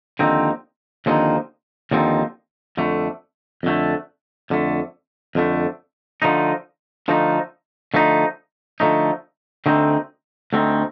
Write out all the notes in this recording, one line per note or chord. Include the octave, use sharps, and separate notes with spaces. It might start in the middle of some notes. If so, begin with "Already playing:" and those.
D#2 D3 F3 C4 D#4
D#2 D3 F3 C4 D#4
D#2 D3 F3 C4 D#4
F2 D3 A3
F2 D3 A3
F2 D3 A3
F2 D3 A3
D3 F3 A3 D#4
D3 F3 A3 D#4
D3 F3 A3 D#4
D3 F3 A3 D#4
D2 D3 A3 C4 D#4
D2 D3 A3 C4 D#4